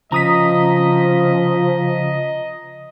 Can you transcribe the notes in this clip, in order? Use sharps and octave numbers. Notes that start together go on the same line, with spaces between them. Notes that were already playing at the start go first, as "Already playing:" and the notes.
C#3 F3 D#5 A#5 D#6 B6